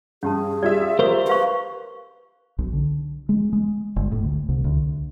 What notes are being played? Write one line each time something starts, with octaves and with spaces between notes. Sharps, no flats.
G2 C#4 G4 G#4 A5
G3 F4 D5 E5
A#4 C5 C#6
G4 B4 F5 C#6
B1
D3
G#3
G#3
G1
A2
D2
C2
D2